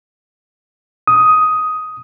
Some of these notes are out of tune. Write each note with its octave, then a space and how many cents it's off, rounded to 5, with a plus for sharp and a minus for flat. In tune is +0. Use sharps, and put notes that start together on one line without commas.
D#6 +10